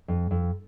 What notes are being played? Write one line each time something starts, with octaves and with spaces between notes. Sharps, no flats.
F2
F2